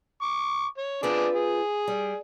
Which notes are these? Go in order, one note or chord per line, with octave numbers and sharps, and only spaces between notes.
C#6 D6
C#5
C4 D4 F4 G#4 B4 D5
G#4
G3